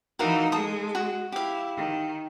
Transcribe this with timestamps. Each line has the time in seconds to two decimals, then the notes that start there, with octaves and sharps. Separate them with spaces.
0.19 E3 D#4 F#4 A#4 F5
0.52 G#3 A4 D#6
0.95 F#4
1.32 E4 G4 F5
1.77 D#3